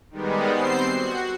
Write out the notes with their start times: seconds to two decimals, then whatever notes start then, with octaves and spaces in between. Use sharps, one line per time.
0.11 D#3 G3 G#3 B3
0.54 C4 C5 C7
0.91 F#4